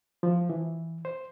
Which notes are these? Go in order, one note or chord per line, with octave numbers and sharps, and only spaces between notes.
F3
E3
C5